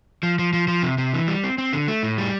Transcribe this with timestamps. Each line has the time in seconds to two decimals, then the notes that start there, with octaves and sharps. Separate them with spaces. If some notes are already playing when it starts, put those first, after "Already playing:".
0.23 F3
0.39 F3
0.53 F3
0.68 F3
0.83 C3
0.98 C3
1.14 E3
1.28 G3
1.44 C4
1.58 C4
1.73 D3
1.88 A3
2.03 A2
2.18 G3